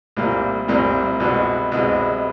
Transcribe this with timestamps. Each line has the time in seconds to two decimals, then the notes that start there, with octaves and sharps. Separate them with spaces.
0.17 C2 A#2 G3 A#3
0.68 C2 A#2 G3 A#3
1.20 C2 B2 G#3
1.72 C2 B2 G#3